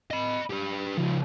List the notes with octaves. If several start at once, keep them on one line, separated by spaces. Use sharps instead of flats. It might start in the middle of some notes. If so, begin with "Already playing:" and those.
D#5 B5
G4 B4
C#3 F3